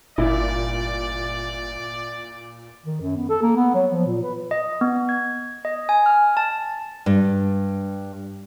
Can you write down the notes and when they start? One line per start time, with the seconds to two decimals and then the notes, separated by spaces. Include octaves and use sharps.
0.18 G1 A#2 E4 D5
2.86 D#3
3.02 F#2
3.16 B3
3.29 A4
3.42 A#3
3.56 B3
3.74 F#3
3.92 F3
4.06 A#2
4.23 B4
4.51 D#5
4.81 B3
5.09 G#6
5.65 D#5
5.89 G#5
6.06 F6
6.37 A5
7.06 G2